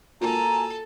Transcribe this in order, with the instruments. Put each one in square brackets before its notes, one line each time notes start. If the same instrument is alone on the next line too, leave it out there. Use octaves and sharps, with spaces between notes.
[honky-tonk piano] A#3 F4 F#4 [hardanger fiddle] A4 [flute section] G#5 A#5